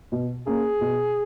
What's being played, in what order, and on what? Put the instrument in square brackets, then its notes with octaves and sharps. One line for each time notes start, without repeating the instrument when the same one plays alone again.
[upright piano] B2
[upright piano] A#3 C#4 [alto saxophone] G#4
[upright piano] B2